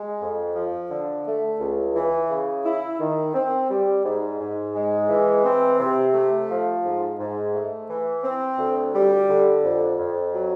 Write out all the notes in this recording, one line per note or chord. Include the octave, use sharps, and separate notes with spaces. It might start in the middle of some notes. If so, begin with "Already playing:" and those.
Already playing: G#3
F2
F3
D3
A3
C#2
E3
C#3
E4
D#3
C4
G3
G#2
G#2
G#3
E3
C4
C3
A3
F3
G#2
G#2
A3
E3
C4
D2
G3
D3
F2
F2
F#3